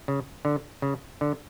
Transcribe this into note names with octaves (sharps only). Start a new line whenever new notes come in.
C#3
D3
C#3
D3